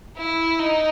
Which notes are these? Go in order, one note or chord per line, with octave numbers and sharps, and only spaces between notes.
E4
D#4